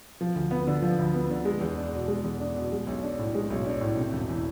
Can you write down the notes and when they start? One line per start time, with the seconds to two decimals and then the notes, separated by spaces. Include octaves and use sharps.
0.21 F3
0.36 D2
0.51 B3
0.67 D3
0.82 F3
0.99 D2
1.14 B3
1.31 D3
1.45 G#3
1.61 E2
1.77 D4
1.93 B2
2.08 G#3
2.24 E2
2.40 D4
2.56 B2
2.72 G#3
2.87 B1
3.03 D4
3.19 A2
3.35 G#3
3.50 B1
3.66 D4
3.81 A2
3.97 C3
4.13 E1
4.29 E3